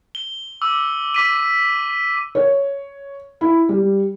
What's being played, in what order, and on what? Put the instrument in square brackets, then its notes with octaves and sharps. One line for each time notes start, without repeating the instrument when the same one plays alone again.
[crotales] G7
D6 E6
D6 B6 D#7
[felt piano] C#5
E4
G3